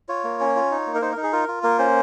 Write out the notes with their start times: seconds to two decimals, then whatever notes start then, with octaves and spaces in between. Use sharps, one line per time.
0.09 F4 C#5
0.24 A#3
0.40 C#4
0.56 F4
0.71 D#4
0.87 A#3
0.95 A#4
1.02 D#4 C5
1.12 A#4
1.17 D#4
1.23 G#4
1.32 F4 A#4
1.48 F4
1.63 A#3 A#4
1.79 C#4 C5